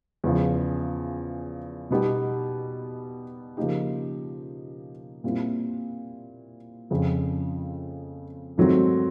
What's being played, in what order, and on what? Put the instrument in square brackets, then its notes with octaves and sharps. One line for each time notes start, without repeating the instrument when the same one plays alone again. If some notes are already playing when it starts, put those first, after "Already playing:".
[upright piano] E2 C#3 F3
B2 G3 B3 D#4 G4
C#3 F3 A#3 D#4 G4
A#2 G3 C4 E4
F2 C#3 F3
G#2 D#3 F#3 A3 C4